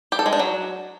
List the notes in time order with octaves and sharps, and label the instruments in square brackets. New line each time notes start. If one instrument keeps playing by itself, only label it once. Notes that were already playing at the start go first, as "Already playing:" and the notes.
[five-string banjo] G4
A4
G#3
D4
F#3